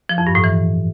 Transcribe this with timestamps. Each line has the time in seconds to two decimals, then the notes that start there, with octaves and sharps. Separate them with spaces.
0.09 F3
0.18 F2
0.27 G2
0.35 A2
0.44 E3